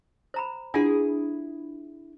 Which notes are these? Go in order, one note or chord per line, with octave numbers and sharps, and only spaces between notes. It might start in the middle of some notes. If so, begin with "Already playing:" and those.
C5 A#5 B5
D4 E4 F4 G#4 F#5